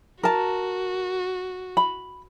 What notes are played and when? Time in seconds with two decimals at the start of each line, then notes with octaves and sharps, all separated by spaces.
0.23 F#4 A#4 A5
1.77 B5